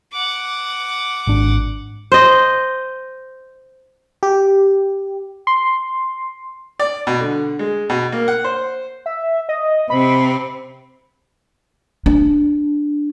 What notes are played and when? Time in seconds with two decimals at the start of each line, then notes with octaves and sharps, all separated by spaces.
0.13 F#5 D6
1.27 G#1 D4
2.12 C5 D#5
4.23 G4
5.47 C6
6.79 D5
7.07 B2
7.21 D3
7.59 G#3
7.89 B2
8.12 A#3
8.28 F#5
8.44 C5
9.06 E5
9.49 D#5
9.90 C3 C4 B5
12.06 D4